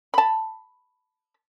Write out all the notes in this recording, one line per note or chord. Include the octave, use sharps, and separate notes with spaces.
A5 B5